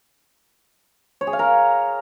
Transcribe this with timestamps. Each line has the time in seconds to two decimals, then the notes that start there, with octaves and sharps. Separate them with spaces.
1.21 C#5
1.27 G#4
1.33 F5
1.39 A#4